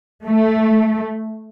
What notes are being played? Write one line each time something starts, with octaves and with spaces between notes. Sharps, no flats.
A3